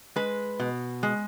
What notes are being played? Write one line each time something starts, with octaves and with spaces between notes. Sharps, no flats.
G#3 B4
B2
G#3